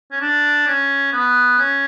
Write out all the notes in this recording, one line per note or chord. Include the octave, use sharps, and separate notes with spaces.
C#4
D4
C#4
B3
C#4